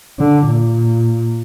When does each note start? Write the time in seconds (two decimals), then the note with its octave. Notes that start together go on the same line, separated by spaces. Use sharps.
0.19 D3
0.47 A#2